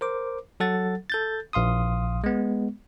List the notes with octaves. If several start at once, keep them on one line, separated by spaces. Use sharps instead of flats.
A#4 C5 D6
F#3 A4 F#5 A6
A4 G6 A6
A#1 F5 C6 D#6
G#3 B3